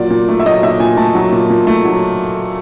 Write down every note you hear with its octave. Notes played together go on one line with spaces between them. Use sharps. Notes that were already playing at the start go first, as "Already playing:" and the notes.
Already playing: A#2 F#3 D5
A#2
A3
E5
F#3 D#5
A#2 E5
A#2 G#5
A3 A5
F#3
A#2
A#2
A3
F#3